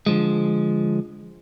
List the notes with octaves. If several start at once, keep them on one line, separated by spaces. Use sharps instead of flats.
D3 F3 G#3